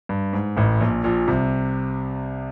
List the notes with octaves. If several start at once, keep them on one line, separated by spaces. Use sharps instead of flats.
G2
G#2
A1 A2
A#1 A#2
A#1 A#2
C2 C3